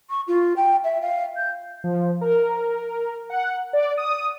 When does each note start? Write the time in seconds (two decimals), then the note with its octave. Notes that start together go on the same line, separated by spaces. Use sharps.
0.10 C#6
0.27 F4
0.56 G5
0.84 E5
1.01 F5
1.36 G6
1.84 F3
2.21 A#4
3.30 F#5
3.73 D5
3.97 D#6